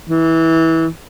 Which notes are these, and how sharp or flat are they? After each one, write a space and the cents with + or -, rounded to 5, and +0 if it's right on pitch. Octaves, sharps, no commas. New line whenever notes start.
E3 -20